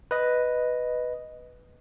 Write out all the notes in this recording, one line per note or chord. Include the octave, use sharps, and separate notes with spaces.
B4 D#5